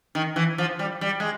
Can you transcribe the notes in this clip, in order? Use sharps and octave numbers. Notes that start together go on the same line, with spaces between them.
D#3
E3
F3
G3
G3
G#3